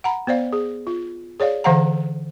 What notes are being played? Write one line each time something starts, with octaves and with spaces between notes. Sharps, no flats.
F#5 A#5 B5
B3 C5 D5 F5
G#4
F4
G#4 C#5 D5 F5
D3 E3 C5 F5 F#5 A#5